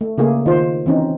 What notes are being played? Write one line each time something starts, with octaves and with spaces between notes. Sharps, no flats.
A3
C#3 A3 A#3 G#4
D#3 F4 C5
E3 C4 C#4 D#4